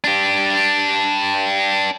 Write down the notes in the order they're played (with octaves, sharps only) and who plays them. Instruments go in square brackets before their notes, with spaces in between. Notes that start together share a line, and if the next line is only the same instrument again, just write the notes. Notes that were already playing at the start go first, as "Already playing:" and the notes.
[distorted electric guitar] D4 G4